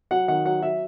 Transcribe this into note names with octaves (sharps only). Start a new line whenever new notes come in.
F#3 F#5
D#3 F#5
F#3 F#5
F#3 E5